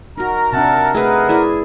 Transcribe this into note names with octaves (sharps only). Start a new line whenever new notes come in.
D#4 F#4 A#4 A#5
C3 D4 E5 F#5 A5
A3 D#4 G#4 B4 E5 F#5
E4 G#4 D5